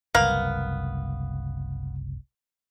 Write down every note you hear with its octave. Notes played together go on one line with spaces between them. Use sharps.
F#1 C2 A#3 B3 F5